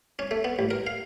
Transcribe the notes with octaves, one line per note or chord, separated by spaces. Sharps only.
C#4
A3
B3
A1
A#4
F5